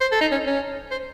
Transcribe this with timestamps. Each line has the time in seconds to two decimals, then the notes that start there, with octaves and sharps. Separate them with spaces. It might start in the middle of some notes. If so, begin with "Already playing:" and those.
0.01 C5
0.12 A4
0.21 D#4
0.32 C#4
0.47 C#4
0.91 C5